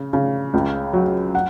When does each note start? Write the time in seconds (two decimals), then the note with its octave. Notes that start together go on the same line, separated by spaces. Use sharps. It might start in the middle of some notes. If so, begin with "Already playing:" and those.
Already playing: C#3
0.13 C#3
0.54 C#2
0.93 F#3
1.35 F#5